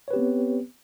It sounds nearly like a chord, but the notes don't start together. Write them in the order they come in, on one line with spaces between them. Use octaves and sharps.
C#5 B4 G4 C4 B3